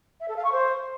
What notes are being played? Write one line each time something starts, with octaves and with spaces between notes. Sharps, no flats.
E5
A4
F5
C#6
C5